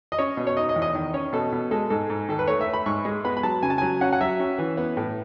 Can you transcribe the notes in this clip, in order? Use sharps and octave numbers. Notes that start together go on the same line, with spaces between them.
D#5
C#4 C#5
B2
C#5
D#4 D#5
D#5
E2
D#5
D#3
C#4 C#5
B2 A4
B2
G#3 A4
G#2 A4
G#2
D#3 A4
B4
A3 C#5
E5
A3
B5
G#2 C#6
G#3
B3 B5
B5
F#3 A5
C#3 G#5
A5
F#3 G#5
C#4 F#5
F#5
F#3 E5
C#4
E3
B3
A2